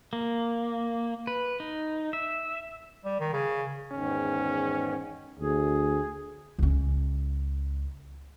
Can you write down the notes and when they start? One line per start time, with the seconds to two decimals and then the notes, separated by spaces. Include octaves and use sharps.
0.13 A#3
1.27 B4
1.60 D#4
2.13 E5
3.05 G3
3.20 D#3
3.33 C#3
3.92 E2 G#2 D#3 C#4
5.39 D2 G#4
6.58 C#2 C#4